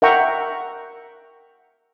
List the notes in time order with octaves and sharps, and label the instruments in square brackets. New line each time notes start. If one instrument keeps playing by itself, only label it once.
[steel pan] A#4 E5 F#5 G5 A#5 C#6